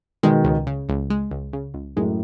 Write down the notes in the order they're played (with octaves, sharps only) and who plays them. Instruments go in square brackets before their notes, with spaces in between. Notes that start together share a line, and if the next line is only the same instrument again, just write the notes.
[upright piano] B2 D#3 [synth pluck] G#3
[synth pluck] C#2
C#3
C#2
G#3
C#2
C#3
C#2
[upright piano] F#2 A2 [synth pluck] G#3